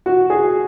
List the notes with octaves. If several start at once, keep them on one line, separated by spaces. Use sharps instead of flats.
F#4
G#4